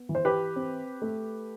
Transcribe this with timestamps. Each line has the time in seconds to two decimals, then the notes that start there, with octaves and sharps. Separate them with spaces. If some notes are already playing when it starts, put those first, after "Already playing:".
Already playing: B3
0.09 E3
0.15 C5
0.25 G4 B4
0.56 C4
1.02 A3